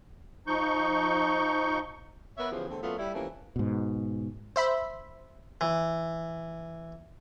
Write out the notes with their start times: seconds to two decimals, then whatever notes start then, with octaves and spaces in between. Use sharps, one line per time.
0.47 F3 D#4 C#6 G6
2.38 B3 A#4 B4 C#5 E5
2.51 E2 C#3 E3 F3 G4 G#4
2.69 E2 D3 A3 C4
2.82 A#2 F#3 A3 B3 C#4 F4
2.98 G3 E4
3.14 C3 E3 F3 A3 A#3 C#4
3.56 G#2 B2
4.56 C5 E5 B5
5.61 E3